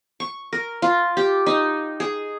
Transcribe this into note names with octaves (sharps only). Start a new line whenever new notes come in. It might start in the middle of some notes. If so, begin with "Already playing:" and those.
C#6
A#4
F4
G4
D#4
G#4